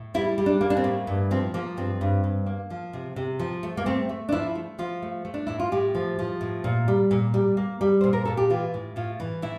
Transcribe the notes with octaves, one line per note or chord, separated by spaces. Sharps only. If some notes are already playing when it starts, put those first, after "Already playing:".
Already playing: A2
G3 E4
G3
D4
A#3
D4
C4
A2
G2
F3 C4
F3 A#3
G2 C4
G2
G2
A#3
F3
C3
C3
F3
A3
A#3
A3 C4
A3
D4
F3 E4
A3
F3 F4
A3
A3
D4
A2 E4
F4
A2 G4
F3
F3
A2
A#2
G3
A#2
G3
A#3
G3
A#2 C5
A#4
A#2 A4
G4
E3 F4
A2
A2 F4
E3
A2 E4